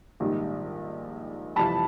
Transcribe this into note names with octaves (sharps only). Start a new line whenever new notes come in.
A#1 G#2 D#3 G3
F2 C3 E3 G3 A5 B5